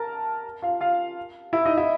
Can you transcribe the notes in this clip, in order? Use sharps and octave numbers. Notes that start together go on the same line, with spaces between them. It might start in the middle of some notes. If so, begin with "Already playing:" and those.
Already playing: A#4 A5 A#5
F4 F5
F4 F5
E4 E5
D#4 D#5
E4 E5